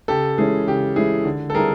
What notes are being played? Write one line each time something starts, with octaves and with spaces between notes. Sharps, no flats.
C#3 G4 A4
E3 G#3 C#4 E4 G#4
C#3 G4
E3 G#3 C#4 E4 G#4
D3
A4
G3 C4 E4 G#4 A#4